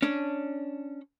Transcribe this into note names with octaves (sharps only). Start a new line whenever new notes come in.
C#4 D4